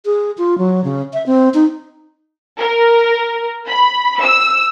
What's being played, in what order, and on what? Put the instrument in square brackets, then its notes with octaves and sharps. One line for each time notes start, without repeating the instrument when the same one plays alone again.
[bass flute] G#4
F4
F#3
C#3
E5
C4
D#4
[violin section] A#4
B5
E6